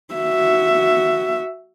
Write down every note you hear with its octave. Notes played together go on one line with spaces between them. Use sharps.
F#4 E5